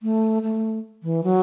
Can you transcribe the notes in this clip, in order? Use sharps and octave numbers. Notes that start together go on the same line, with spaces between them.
A3
A3
E3
F#3